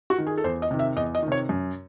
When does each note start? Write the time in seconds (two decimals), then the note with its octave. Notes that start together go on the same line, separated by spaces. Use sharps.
0.10 F#4
0.18 D#3
0.27 G#4
0.38 A4
0.44 E2 C5
0.62 D#5
0.71 C3 D#3
0.79 E5
0.96 E2 D#5
1.15 D#5
1.23 D#3
1.28 C3 C#5
1.49 F#2